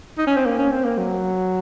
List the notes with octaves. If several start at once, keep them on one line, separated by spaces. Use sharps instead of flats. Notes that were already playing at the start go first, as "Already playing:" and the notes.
D#4
C#4
C4
A#3
C#4
C4
A#3
F#3